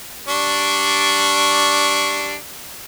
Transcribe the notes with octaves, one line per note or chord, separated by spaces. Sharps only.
G3 D4 C#6